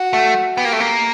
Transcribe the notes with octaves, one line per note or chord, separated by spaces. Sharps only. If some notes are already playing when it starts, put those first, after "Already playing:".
Already playing: F#4
A3
B3 G4
A#3
A3
A#3